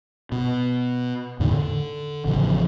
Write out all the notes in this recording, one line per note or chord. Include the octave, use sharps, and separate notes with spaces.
B2
E2 A2 D3 D#3
D3
A1 C#3 F3